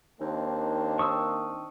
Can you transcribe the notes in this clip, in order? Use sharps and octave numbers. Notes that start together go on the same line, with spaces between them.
D#2 D#3 A#3 C4 D4
C#6 D#6 E6